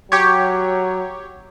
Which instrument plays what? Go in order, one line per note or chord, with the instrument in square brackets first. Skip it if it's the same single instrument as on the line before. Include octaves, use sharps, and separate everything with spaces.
[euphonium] F#3 [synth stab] G4 C#5